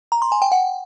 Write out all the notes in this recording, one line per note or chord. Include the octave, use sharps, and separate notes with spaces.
A#5
C6
G#5
G5
F#5